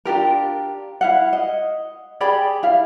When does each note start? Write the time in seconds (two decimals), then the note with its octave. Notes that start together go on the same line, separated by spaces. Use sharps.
0.05 D4 F4 G4 A#4
1.01 E4 F5 F#5
1.33 D#5
2.21 G4 G#4 D5 B5
2.63 E4 F5